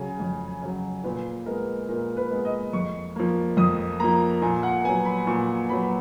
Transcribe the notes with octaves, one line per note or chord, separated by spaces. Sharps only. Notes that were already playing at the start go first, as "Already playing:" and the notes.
Already playing: C#3 F#3 G#5
F2
C#3 F#3
A#2 B4
G#3 B3 A#4
A#2 A#4
B4
G#3 B3
D#5
F2 C#6
F3 A#3
F2 D#6
F3 A#3 A#5
A#2 G#5
F#5
F#3 B3 G#5
B5
A#2 C#6
F#3 B3 B5